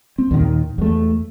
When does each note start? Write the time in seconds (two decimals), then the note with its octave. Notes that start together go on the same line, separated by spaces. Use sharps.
0.18 C4
0.31 D#2 A#2 D#3
0.78 E2 A3